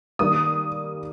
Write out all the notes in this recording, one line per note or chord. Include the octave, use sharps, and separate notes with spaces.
D#3 G3 A#3 D#6